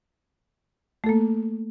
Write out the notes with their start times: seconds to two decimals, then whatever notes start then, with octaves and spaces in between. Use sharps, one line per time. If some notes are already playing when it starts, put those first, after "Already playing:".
1.04 A3
1.06 A4
1.09 A#3